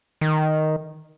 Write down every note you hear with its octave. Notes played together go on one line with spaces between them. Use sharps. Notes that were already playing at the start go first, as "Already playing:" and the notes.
D#3